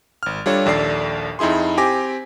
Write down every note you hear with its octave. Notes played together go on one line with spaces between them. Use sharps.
G#1 F6
G3 D4 F4 A4 C#5
A#1 D#2 A4 D5 C7
F2 D#4 E4 G#4 C6
C4 G4 G#5 D6 A#6